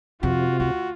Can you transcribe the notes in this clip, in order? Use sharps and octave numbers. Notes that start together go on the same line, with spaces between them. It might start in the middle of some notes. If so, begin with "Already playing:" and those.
F2 C3 F4 F#4
D2 F#4